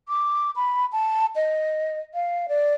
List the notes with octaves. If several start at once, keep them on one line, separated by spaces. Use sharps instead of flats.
D6
B5
A5
D#5
F5
D5